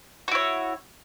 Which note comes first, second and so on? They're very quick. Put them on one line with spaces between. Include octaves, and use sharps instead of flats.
F#4 E4 C#5